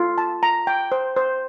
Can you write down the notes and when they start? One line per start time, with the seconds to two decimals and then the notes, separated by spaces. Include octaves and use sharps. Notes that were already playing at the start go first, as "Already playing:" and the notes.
Already playing: F4 A4
0.18 A5
0.43 A#5
0.67 G5
0.92 C5
1.17 C5